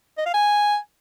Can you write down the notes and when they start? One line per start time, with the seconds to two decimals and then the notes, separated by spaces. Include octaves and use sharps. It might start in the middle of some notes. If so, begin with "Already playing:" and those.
0.18 D#5
0.26 F5
0.34 G#5